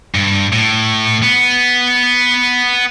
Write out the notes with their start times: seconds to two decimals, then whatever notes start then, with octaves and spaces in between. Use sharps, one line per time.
0.15 G2
0.52 A2
1.23 B3